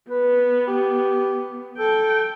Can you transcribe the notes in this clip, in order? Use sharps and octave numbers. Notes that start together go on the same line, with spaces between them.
B3 B4
G4
A4 G5